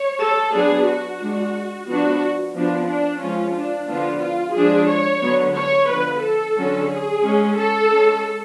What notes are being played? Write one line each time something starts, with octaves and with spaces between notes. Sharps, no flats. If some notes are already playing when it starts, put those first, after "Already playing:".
Already playing: C#5
A4
F#3 B3 D4 G#4
F#4
G#3 D4
F3 B3 D4 F#4
F3 B3 D4
D4
F3 G#3 C#4 F4
D4
D3 F3 B3 D4 F4
F4
F3 G#3 D4 G#4
C#5
D3 F#3 B3
C#5
D3 F3 B3 B4
A4
D3 F#3 C#4
G#4
G#3 C#4
A4
G#3 C#4